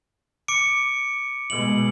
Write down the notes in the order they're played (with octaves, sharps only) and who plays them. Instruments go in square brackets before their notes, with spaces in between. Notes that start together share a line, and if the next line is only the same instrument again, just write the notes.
[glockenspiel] D6 C#7 D7
[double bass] B2 G#3 [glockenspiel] F#7